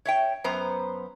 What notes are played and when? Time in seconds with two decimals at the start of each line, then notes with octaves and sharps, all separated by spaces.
0.05 C#5 E5 G5
0.44 F#2 B3 C5 A#5